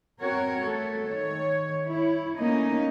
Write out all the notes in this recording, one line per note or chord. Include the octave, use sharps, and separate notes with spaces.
C4 F#4 A#4 C#5
A3 A4
D#3 C#5
E4 C#5
A3 A#3 C#4 D#4 D#5